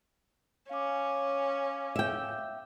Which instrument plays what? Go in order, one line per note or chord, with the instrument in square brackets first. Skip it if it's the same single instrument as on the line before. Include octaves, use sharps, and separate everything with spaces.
[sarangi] C#4 [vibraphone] F5 D6
[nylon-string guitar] E5 G5